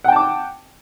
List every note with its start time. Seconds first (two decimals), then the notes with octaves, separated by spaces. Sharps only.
0.04 F#5
0.08 G5
0.12 A5
0.16 D6